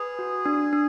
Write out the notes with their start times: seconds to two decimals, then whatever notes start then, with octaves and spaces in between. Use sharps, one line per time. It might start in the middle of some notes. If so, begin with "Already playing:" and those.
Already playing: G#4 B4
0.19 F#4
0.46 D4
0.73 D4